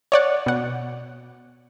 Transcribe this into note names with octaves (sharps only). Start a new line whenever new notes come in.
C#5 D5 F#5
B2 F#5